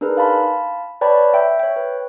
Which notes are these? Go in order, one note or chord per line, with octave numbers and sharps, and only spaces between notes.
D4 D#4 G#4 A#4 B4
F5 A5 B5 C6
B4 C#5 D5 G5 A5 B5
E5 G5
C#5 G5
B4